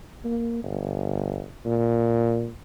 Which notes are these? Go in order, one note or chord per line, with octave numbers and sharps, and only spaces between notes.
A#3
G1
A#2